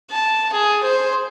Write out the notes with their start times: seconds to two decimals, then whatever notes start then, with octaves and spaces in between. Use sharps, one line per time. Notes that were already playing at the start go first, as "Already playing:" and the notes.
0.11 A5
0.53 G#4
0.83 C5